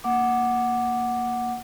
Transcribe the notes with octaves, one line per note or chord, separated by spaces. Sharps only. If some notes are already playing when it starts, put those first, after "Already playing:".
A#3 F#5 D6